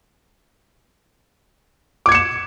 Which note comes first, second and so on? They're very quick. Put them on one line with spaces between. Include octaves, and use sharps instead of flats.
D6 G#6 C#7 E7